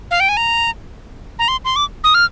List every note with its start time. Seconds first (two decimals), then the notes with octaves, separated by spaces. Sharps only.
0.11 F5
0.20 G5
0.29 G#5
0.37 A#5
1.39 A#5
1.48 C6
1.65 C6
1.76 D6
2.04 D#6
2.14 F6